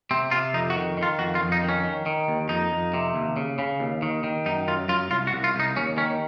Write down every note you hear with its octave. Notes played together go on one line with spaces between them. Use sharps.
C3 C4
C3 F4
F2 D#4
F#4
D#3
D#3
F4
F2 F#4
F4
F2
D#4
D#3
C#4
D#3
D#3
D#2
F2 D#4
F2
C3
D#2
C#3
C#3
D#2
D#3
D#3
F#2 D#4
F#2 F4
F#2 F4
C2 F4
F#4
C2
F4
C2 D#4
D#2 C#4
D#3 C#4